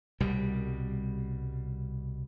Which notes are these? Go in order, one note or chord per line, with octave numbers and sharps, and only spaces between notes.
C2 B2 G3